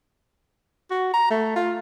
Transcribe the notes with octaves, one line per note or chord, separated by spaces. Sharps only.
F#4
A#5
A3
F4